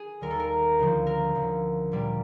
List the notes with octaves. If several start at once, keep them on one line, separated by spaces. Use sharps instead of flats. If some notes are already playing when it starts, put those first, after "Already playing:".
Already playing: G#4
D#2 D#3 G3 A#4
A4
A#4
D2 C#3 F3
A#4
D2 C#3 F3
A#2 G3 A#3